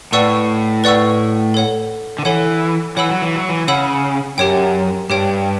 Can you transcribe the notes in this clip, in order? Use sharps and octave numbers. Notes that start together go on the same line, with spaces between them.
A2 B4 D5 F#5 C#6 E6
B4 D5 F#5 C#6 E6
A4 C#5 F#5
D3
E3 A4 C#5 F#5
E3 C#5 F#5 B5 E6
F#3
E3
F#3
E3
C#3 C#5 F#5 B5 E6
F#2 G4 C#5 G5
G2 G4 C#5 G5